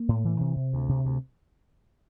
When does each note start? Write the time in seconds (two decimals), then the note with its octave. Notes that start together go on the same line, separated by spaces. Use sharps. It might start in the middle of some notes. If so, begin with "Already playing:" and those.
Already playing: A#3
0.09 A2
0.24 E3
0.41 C3
0.56 C3
0.73 D2
0.89 C3
1.05 D2